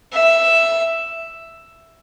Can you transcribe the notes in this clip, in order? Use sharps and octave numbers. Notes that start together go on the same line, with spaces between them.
E5